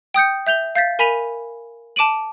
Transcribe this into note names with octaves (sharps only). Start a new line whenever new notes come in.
G5 D#6 G6 C#7
E5 G6 F7 G7
F5 G6 A6 B6
A#4 G#5 B5 B6 D#7 F7
A5 D6 D7 D#7 F#7